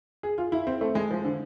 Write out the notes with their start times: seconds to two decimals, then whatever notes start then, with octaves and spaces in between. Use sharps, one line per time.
0.23 G#4
0.38 F4
0.52 E4
0.67 C4
0.81 A3
0.95 G#3
1.11 F3
1.25 D3